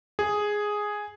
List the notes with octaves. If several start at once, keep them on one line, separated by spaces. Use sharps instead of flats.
G#4